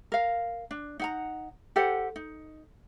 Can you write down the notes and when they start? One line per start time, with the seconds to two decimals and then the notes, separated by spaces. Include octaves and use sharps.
0.12 A#4 F5
0.71 D4
1.00 D#4 F#5 A#5
1.76 G4 A4 C5 F#5
2.16 D#4